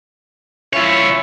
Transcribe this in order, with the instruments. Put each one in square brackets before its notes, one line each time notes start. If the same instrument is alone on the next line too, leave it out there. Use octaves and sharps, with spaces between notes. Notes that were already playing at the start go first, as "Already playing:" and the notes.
[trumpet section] C#4 E4 E5 [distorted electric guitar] F4 C#5